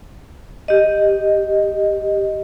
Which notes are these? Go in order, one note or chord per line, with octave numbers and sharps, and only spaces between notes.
G4 D#5